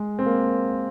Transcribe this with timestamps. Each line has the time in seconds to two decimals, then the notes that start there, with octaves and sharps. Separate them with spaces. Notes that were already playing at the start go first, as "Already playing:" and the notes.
Already playing: G#3
0.19 C4
0.26 A#3